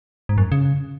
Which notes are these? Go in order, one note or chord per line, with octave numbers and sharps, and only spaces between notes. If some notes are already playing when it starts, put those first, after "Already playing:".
G#2
F#2
C#3